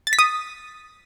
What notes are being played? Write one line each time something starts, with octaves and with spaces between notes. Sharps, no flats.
A6
B6
D#6